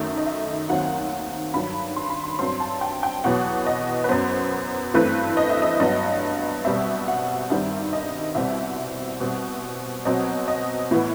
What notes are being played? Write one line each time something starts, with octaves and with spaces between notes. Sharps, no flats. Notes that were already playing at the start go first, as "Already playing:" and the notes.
Already playing: F#2 D#3 A3 E5
D#5
E5
D#2 D#3 F#3 C4 F#5
G2 D#3 F#3 B5
C6
B5
C6
G2 F#3 C4 C6
A5
G5
G5
E2 B2 F#3 B3 F#5
D#5
B4
F#2 F#3 B3 C5
G2 E3 A3 C4 B4
D#5
E5
D#5
G2 F#3 B3 D#5
B2 G3 C4 E5
F#5
G2 D#3 G3 C4 E5
D#5
C2 B2 G3 C4 E5
B2 G3 C4
B2 F#3 C4 D#5
D#5
A2 E3 B3 E4